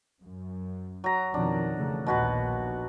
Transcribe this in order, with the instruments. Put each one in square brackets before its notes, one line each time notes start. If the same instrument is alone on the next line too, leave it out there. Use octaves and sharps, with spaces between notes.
[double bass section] F#2
[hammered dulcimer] F#3 A#5
[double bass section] F2 B2 D#3 [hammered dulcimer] D4
[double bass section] C#3 E3 A3
[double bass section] A#1 D#2 [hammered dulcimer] B2 F#4 B4